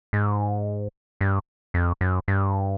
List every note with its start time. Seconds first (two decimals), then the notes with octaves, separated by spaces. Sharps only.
0.13 G#2
1.21 G2
1.74 F2
2.01 F#2
2.28 G2